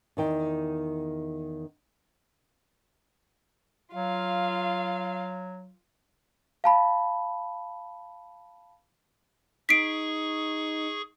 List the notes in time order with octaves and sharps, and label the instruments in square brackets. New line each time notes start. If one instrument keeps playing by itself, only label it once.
[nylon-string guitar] E2 D#3 G5
[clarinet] F#3 [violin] F4 F5
[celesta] F5 A5 B5
[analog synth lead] D#4 [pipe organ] G#4 C#6 [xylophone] B6 C7 D7